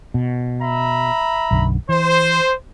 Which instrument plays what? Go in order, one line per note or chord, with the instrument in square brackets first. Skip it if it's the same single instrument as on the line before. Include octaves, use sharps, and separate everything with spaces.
[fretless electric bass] B2
[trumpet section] E5 A#5 B5
[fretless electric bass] B1 F#2 D3
[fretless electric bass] E3 [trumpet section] C5